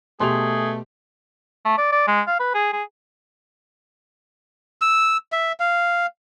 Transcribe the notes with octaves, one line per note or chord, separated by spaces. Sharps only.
B2 A3 G4 G#4 C6 F7
A3
D5
D5
G#3
F5
B4
G#4
G#4
E6
E5
F5